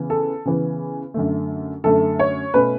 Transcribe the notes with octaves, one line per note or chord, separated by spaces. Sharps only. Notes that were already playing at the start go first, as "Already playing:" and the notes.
Already playing: C#3 E3 B3
A4
C#3 E3 B3
F#2 D3 A3
F#2 D3 A3 A4
C#5
B2 A3 C#4 B4